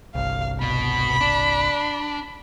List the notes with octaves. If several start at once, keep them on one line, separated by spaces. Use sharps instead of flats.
G1 C2 F5
B2 B5
D4